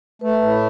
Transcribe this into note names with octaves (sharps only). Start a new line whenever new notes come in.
A3 B4
A2